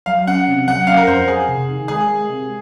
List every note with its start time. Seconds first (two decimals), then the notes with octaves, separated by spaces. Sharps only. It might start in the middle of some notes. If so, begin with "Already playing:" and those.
0.06 F#3 F5
0.27 C#4 F#5
0.48 C3
0.67 F#3 F#5
0.87 C#4 F5
0.97 A#4
1.07 F2 C5
1.28 F2 G#4
1.48 C3
1.68 D#3
1.88 G#3 G#4
2.08 G#3
2.29 C3